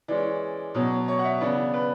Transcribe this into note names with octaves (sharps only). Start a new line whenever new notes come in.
E3 G#3 C#4 D5
B2 F#3 C#4
C#5
F#5
E5
C#3 E3 B3 D4
B4